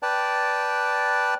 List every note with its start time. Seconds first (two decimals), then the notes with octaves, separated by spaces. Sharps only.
0.03 B4 D5 G5 A5